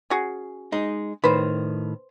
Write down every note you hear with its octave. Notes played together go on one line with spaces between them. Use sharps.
C#4 F#4 G#4
G#3 D#4
A2 D#3 B4 C5